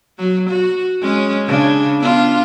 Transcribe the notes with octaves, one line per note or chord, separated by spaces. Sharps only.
F#3
F#4
G#3 C#4
C#3 D4
B3 D4 F4